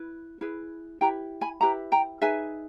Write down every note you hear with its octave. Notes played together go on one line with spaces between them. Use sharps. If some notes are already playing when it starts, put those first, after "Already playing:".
Already playing: E4 B4
E4 G#4 B4
E4 G4 B4 G5 A#5
G#5 B5
E4 G4 B4 G5 A#5
G5 A#5
D#4 G#4 B4 E5 G#5